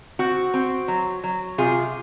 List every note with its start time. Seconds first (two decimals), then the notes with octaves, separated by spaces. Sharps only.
0.19 C4 F#4
0.54 C4
0.88 F#3
1.24 F#3
1.58 C3 F4 G#4